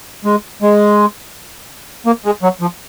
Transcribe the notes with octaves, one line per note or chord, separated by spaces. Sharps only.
G#3
G#3
A#3
G#3
F#3
F3